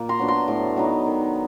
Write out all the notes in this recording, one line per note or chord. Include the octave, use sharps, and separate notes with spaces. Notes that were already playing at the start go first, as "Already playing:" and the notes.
Already playing: A#2 A#3
A#5 C6
F#3 B3 D4
A#5 C6
A2
F#3 B3 D#4
D#3